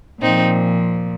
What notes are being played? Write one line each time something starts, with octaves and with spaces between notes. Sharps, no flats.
A#2 F3 C4 D#4